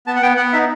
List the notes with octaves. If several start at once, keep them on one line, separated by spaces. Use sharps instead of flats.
B3 A5
F#5
B3 G5
B3 F#5
D#4 E5